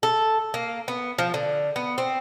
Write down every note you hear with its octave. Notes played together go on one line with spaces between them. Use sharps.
A4
A#3
B3
F3
D3
B3
C4